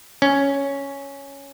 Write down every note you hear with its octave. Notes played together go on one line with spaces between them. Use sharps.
C#4